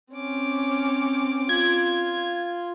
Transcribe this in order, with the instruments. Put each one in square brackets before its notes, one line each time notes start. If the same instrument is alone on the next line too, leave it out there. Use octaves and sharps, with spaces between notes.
[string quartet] C4 C#4 D6
[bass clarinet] F4 [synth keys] G#6